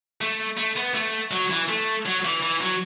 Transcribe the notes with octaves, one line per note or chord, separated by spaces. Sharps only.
A3
A3
B3
A3
F#3
E3
A3
F#3
E3
E3
F#3